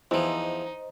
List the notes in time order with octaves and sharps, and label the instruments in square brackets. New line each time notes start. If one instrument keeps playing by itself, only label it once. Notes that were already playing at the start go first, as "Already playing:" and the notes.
[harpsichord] E2 F3 [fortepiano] E3 [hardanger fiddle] D#4 [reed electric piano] C5 D#5